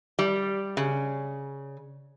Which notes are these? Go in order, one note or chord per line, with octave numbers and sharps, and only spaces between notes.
G3
C#3